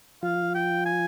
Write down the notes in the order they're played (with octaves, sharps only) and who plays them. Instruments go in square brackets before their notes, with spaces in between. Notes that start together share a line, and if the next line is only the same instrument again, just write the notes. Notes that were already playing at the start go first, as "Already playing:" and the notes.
[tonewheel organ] F3 F4 [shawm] F5
[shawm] G5
G#5